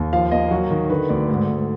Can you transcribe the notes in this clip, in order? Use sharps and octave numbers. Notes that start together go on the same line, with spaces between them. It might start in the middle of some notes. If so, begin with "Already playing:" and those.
Already playing: D#2
F3 F5
A#3 D#5
F#3 F#4
D#3
D3 B4
D2 D5
G#2
G#2